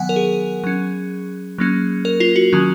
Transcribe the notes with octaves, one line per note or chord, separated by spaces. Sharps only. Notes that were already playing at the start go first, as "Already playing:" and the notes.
Already playing: D#3 F#3 B3 F#5 G#5
A#4
G#4
F#3 C#4
F#3 A#3 C#4
A#4
F4
F#4
D#3 F#3 C#4